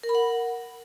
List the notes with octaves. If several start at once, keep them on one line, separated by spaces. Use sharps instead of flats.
A#4
B5
F#5